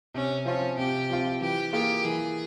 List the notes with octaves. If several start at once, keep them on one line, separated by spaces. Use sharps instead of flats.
C3 C#4
F3 C4 C#4 F4
C3 G4
F3 C4 F4
E3 G4
A#3 F4 G4 G#4
E3 G#4